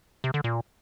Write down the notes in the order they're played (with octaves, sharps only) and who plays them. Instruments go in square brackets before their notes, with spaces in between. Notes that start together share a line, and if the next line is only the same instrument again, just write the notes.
[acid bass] C3
D3
A#2